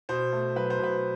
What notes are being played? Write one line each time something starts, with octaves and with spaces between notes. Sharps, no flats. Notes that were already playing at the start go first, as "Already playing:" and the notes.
B2 C5
A3
F#3 B4
C5
B2 B4